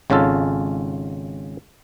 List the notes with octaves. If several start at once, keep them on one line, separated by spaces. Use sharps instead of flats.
G#1 C#3 C#4 F4 A4